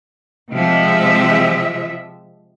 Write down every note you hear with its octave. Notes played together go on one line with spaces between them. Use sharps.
C3 F3 G#3 E5